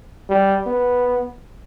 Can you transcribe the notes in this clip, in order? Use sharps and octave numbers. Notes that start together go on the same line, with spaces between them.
G3
B3